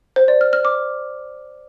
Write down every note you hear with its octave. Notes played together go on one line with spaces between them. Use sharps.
C5
D5
F6
F6
D6